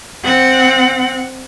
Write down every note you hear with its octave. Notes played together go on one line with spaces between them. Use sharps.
C4 F#5